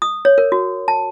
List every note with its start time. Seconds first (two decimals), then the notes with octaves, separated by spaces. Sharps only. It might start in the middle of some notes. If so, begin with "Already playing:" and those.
0.02 D#6
0.25 C#5
0.38 A#4
0.52 F#4
0.88 A5